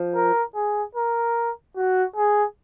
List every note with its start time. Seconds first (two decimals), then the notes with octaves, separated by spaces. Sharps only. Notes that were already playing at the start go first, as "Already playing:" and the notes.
Already playing: F3
0.15 A#4
0.55 G#4
0.95 A#4
1.76 F#4
2.16 G#4